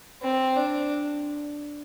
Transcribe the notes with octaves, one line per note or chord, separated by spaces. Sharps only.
C4
D4